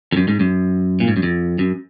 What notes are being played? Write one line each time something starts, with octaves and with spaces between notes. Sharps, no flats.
F2
F#2
G#2
F#2
A#2
G#2
F#2
F2
F#2